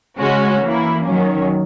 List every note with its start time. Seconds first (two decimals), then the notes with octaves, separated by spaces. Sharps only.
0.18 C#3 G#3 C#4 F#4
0.62 E3 A#3 E4
1.05 D#3 F#3 C#4